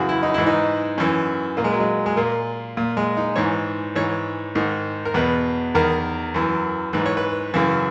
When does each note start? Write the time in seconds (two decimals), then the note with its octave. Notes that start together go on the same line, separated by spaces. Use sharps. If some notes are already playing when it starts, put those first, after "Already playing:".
Already playing: F#2 C#3 E3 F#4 G#4
0.09 E4
0.23 D#4
0.34 G#2 E3 E4
0.47 D#4
0.98 F#2 E3 C#4
1.57 A#2 A#3
1.64 G#3
1.72 F#3
1.80 G#3
2.06 G#3
2.17 A#2 A#3
2.77 A#2
2.97 G#3
3.17 D#4
3.36 G#2 E3 C#5
3.95 G#2 E3 C#5
4.55 G#2 D#3
5.05 A#4
5.14 E2 B2 B4
5.74 E2 D#3 A#4
6.34 F#2 E3
6.93 G#2 E3 B4
7.06 C#5
7.17 B4
7.54 F#2 C#3 E3